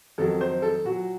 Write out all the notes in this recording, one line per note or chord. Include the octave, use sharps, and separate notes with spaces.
F2 D#3 F#3 A4
C5
A4
A#2 F#3 F#4